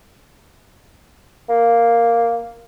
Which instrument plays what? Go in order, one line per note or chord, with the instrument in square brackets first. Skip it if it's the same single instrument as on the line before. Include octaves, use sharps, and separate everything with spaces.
[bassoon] A#3